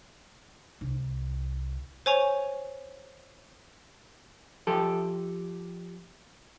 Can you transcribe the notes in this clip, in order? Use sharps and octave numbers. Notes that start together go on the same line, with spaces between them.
C2
C5 C#5 G#5 C#6 F7
F3 G4 A4